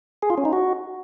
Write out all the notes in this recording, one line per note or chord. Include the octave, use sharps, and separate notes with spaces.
G#4
F4
C#4
D#4
F#4